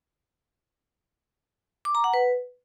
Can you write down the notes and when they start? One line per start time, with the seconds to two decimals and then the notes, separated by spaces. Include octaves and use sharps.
1.85 D6
1.95 A#5
2.04 F#5
2.14 B4